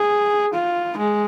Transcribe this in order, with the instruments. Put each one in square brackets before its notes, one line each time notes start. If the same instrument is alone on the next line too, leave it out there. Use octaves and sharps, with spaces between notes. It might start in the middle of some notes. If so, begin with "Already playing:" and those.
Already playing: [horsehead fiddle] G#4
F4
G#3